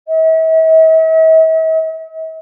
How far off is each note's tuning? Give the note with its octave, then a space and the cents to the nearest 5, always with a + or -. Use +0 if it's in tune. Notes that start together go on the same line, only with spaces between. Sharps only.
E5 -45